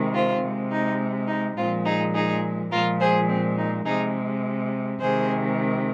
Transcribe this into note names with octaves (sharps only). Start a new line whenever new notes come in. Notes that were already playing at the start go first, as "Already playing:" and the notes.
Already playing: C3 D#3 G#3
C4 F4
C3 G#3
D#4
D#4
A#2 F3 G#3 C4 F4
D#4 G#4
D#4 G#4
A#2 F3 G#3 F4 A#4
G#4 C5
C4
D#4
C3 G#3 D#4 G#4
C3 D#3 G#3 G#4 C5